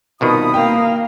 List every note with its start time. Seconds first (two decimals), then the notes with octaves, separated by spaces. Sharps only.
0.21 C2 B2 D#3 F4 B5 D#6
0.54 A#3 F5 G5